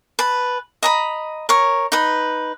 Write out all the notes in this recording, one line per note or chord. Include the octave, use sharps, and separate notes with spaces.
B4 A5
D#5 A#5 B5
A#4 C#5
D#4 B4